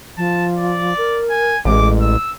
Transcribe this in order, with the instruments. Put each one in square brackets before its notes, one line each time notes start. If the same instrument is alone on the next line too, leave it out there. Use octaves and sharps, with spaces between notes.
[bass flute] F3 [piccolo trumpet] A5
[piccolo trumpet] D5
[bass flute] A#4
[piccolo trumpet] G#5
[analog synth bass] A1 [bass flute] G#3 [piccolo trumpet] D6
[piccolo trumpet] E6